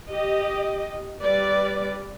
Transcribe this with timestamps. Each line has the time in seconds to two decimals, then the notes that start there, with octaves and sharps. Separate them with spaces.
0.10 G4 D#5
1.22 G3 B4 D5